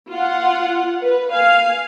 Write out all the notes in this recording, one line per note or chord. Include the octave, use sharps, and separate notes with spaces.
F4 F#5
B4
F5 G#5